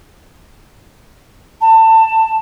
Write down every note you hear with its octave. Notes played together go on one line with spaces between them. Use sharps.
A5